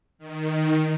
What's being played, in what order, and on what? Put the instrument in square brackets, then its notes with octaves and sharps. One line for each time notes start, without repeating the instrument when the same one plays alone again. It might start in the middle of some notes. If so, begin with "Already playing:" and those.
[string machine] D#3